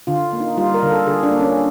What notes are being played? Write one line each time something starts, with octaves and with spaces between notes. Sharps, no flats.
D3 F4
A#3
D#4
G3 F4
A#4
D3
A4
D3 G#4
D4
A#3
C#4